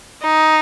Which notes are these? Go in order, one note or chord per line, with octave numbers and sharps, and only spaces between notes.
D#4